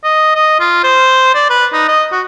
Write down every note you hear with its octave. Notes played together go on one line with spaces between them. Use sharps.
D#5
D#5
F4
C5
D5
B4
D#4
D#5
F#4